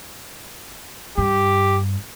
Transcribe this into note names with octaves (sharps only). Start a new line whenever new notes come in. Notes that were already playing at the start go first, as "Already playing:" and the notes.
G2 G4